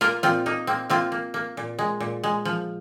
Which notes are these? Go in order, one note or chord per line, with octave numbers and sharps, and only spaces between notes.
A#3 F4 A#4
A#2 C4 F4
A#3 D#4
A#3 C4
A#3 C4 F4
A#3
A#3
A#2
G#3
A#2
G#3
F3